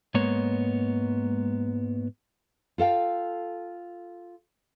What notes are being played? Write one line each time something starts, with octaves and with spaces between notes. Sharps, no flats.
G#2 G#3 A#3 B3 C#5
F4 A4 F5 G5